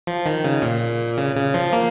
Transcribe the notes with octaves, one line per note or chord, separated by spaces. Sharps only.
F3
D#3
C#3
A#2
C#3
C#3
F3
A#3